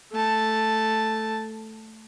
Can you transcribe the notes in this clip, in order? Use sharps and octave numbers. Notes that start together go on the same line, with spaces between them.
A3 A5